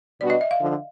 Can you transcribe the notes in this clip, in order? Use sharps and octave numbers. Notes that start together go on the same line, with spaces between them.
B2 G3 B3 D4 F#4 D5
D#5
E5
F5
D3 F3